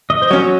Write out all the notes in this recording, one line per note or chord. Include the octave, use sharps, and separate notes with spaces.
D#5
C5
F#3 C#4 C#5